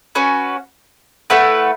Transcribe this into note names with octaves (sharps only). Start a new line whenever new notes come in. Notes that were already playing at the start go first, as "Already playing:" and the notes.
C#4 F#4 B4
A3 E4 B4 F#5